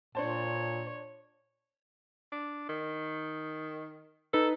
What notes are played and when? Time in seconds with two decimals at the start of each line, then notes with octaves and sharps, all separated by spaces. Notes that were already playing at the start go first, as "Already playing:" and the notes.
0.15 A#2 D4 C5 C#5 A5
2.32 D4
2.69 D#3
4.33 D#4 A4 B4